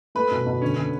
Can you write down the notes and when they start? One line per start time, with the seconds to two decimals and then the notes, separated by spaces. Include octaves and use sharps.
0.15 A3 B4 B5
0.31 B2
0.46 B2
0.61 D3 C#4 C#5
0.77 D3